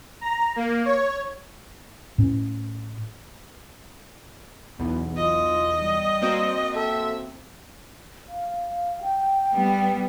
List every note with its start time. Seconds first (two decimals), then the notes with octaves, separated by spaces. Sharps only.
0.21 A#5
0.56 A#3
0.85 C#5
2.18 A2 C#4
4.79 B1 E2 B3
5.16 F4 D#5
5.78 G3
6.22 A#3 C4 F#4
6.76 A4 E5
8.29 F5
9.02 G5
9.53 G3 B3